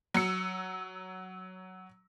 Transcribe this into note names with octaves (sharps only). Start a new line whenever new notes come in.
F#3 E6 C#7